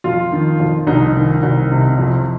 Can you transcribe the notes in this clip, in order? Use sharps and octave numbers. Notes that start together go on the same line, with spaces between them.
F2 F4
D#3
F2
C2 D#4
D#3
C2
C3
F2